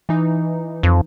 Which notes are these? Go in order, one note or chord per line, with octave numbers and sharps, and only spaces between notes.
E3 D#4
F2